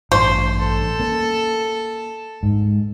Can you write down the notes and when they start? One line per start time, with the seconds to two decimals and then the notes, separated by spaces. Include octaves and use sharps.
0.12 A1 G2 C5
0.59 A4
0.99 A#3 C#4
2.43 G#2